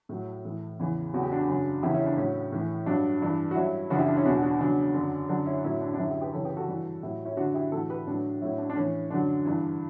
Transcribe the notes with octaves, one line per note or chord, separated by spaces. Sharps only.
A2 F#3
A2 E3
E2 C#3 E3
E2 C#3 F#3 F#4
G4
D4 F#4
F#2 C#3 F#3
E2 C#3 E3 E4 G4
C#4 E4
D4
A2 F#3 C#4
A2 E3
G2 F#3 D4
G2 E3
F#4
G2 F#3 C#4 E4
F#2 C#3 E3 D4 F#4
E4 G4
D4
C#4 E4
E2 B2 F#3 D4 F#4
D4 F#4
E2 C#3 F#3 D4
F#2 D3 F#3
F#2 D3 F#3 D4
C#4 E4
A2 F#3 C#4 E4
D4
D4
F#2 D3 F#3 C#4 E4
E4 G4
G4 B4
F#2 C#3 E3 A4 C#5
G4 B4
F#4 A4
G2 E3
A2 F#3 E4 G4
C#4 E4
F#2 D3 F#3 D4 F#4
E4 G4
A2 E3 F#4 A4
G4 B4
A2 F#3 D4
A2 F#3 C#4 E4
D4
D4
A2 E3 C#4
F#2 D3 F#3 D4
G2 E3